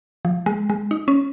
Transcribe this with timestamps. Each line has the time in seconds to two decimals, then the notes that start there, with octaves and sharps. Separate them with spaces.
0.25 F3
0.46 G#3
0.69 G#3
0.91 D#4
1.08 C#4